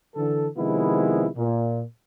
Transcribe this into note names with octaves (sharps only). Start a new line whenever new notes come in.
D3 E3 A4
C3 D#3 F3 G#3 B3 E4
A#2